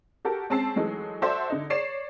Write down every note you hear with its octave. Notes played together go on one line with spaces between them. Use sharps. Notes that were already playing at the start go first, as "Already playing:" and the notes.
F#4 G4 A4 A#4
G#3 C4 C#4 A5 E6 C7
E3 F#3 G#3 A3 D#4
F#4 A4 C5 D5 E5 C6
D3 D#4
C#5 D5 C7 E7